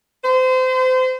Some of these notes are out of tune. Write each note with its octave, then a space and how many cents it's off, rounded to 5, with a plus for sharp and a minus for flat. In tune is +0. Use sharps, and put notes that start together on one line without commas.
C5 -30